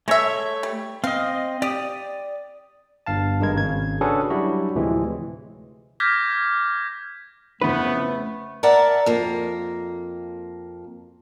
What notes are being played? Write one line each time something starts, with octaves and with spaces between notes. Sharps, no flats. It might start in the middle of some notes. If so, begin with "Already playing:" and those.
G#3 A3 C#5 E5
G3
C4 D#5 F5
G4 D5 D#6
G1 G2 F5 A5
G#1 G2 G#3 A#4 G#6
G#1 C#3 G#6
C#4 D4 F#4 G#4 A4 B4
F#3 G3 D4 E4 F#4
D2 A2 C3 E3 F3 G#3
D6 F6 G6 G#6 A#6 B6
F2 C#3 E3 A3 B3 B4
A#4 D5 E5 F#5 A5
F2 A#3